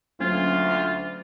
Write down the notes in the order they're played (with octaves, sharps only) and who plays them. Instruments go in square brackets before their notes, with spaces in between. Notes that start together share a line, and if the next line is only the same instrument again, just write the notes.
[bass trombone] D2 [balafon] F#3 A#3 C#4 [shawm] F4